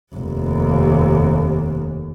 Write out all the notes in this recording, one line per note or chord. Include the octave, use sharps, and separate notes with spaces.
F1 D#2